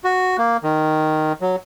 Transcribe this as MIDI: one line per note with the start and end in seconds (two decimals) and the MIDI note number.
0.04 0.37 66
0.38 0.57 58
0.63 1.33 51
1.41 1.56 54